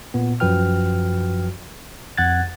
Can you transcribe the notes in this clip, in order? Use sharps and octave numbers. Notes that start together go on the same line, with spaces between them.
A#2 B3
F#2 F3 F#4 B4 G5 F6
F2 F#5 F#6 G#6 A6